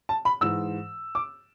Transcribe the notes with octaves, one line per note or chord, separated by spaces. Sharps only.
A5
B5
G#2 E3 E6
D6